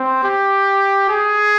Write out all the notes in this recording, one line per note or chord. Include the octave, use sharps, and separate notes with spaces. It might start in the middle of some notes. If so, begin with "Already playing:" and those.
Already playing: C4
G4
G#4